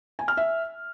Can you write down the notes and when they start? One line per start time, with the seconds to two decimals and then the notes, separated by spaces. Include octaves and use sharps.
0.19 G#5
0.28 F6
0.37 E5